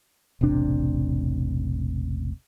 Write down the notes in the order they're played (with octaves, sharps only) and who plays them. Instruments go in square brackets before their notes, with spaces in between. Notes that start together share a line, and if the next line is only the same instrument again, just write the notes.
[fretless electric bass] E1 A1 C3 D4